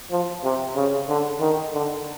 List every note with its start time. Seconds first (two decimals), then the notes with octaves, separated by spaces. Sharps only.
0.11 F3
0.44 C3
0.76 C#3
1.09 D3
1.40 D#3
1.73 D3